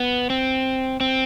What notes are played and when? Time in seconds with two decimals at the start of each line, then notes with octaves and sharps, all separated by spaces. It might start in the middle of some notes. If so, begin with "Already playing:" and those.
Already playing: B3
0.30 C4
1.00 C4